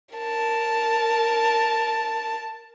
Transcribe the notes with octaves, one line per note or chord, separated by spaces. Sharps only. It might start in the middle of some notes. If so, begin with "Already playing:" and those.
A#4 A5